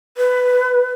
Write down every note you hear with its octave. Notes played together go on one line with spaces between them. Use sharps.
B4